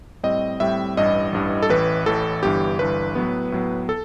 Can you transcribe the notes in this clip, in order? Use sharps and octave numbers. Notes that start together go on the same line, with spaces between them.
A2 G3 C4 D#5
A2 G3 C4 E5
A1 G2 E3 G3 D#5
A1 G2 E3 G3
A4
A1 A2 E3 B4
A1 A2 E3 A4
G1 G2 E3 G4
G1 G2 E3 B4
A2 F#3 B3
A2 F#3 B3
A4